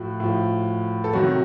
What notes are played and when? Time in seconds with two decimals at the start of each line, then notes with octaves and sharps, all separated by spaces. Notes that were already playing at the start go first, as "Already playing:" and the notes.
Already playing: A2 F3 F#4
0.20 A2 F3
1.04 A4
1.13 C3 D#3 F#3 F#4